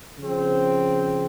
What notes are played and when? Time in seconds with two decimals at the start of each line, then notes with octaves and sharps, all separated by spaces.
0.18 C#3 F3 C4